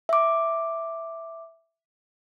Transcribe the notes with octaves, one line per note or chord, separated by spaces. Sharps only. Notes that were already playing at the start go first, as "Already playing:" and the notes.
E5 D6